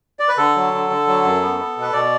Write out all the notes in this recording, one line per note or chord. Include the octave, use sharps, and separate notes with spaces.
D5
B4
D3 A4
F#3
D3
D3
F#3
F#2
B3
B3
B2
B4
B2 D5